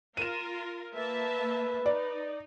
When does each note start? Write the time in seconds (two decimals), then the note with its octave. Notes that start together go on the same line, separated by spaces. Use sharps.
0.17 F4 A#4 D#7 E7
0.96 A#3 B4 E5 A5
1.86 D#4 D5